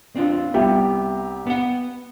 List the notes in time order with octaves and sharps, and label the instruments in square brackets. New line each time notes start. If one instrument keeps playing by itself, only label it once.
[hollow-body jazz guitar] C4 D4 F4
[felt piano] C2 G4 E5 [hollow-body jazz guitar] B3
[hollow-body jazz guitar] B3 F#5